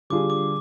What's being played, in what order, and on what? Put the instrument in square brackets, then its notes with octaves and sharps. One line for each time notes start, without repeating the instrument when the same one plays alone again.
[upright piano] D3 G3 D4 F4 G#4 [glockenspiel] D6
[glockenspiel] D6